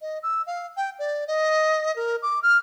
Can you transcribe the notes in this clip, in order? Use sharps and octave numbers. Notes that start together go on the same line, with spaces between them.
D#5
E6
F5
G5
D5
D#5
A#4
D6
F6